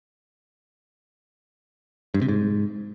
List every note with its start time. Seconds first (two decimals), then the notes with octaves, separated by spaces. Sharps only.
2.14 G2
2.21 C3
2.28 G#2